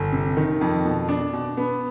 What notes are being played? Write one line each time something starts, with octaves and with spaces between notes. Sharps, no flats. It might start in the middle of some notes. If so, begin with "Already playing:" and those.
Already playing: G1
C3
D#3
F2
B2
D4
B2
B3